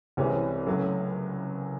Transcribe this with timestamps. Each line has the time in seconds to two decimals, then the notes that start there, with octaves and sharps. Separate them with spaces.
0.17 C2 C3 E3 G#3 C#4
0.66 C#2 C#3 F#3 A3